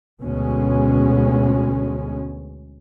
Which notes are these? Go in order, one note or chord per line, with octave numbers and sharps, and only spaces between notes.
D2 B2 G#3 C#4